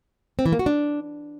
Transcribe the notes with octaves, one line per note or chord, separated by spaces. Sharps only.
C4
E3
A#3
F#4
D4